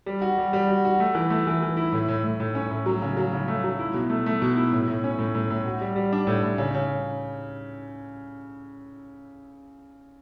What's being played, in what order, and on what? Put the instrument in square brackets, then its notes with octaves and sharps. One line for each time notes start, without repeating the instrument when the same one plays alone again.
[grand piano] G3
F#4
G3
G3
F#4
F#4
A3
E3
A3
E3
E3
E4
A2
A2
A2
A2
C#4
A2
F#3
C#3
F#3
C#3
A3
F#3
E4
B2
A3
A3
B2
E4
A2
A2
C#4
A2
A2
A2
F#4
G3
G3
D4
A2
A2
C#3
C#3